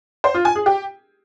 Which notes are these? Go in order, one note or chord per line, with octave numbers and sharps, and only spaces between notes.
C5
F4
G#5
G#4
G4